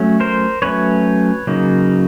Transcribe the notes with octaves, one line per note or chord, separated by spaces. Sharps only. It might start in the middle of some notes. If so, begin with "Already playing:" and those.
Already playing: F#3 A3 C#4
A#4 C5
F#3 A3 C#4 B4 C#5
C#3 F#3 A#3 D#4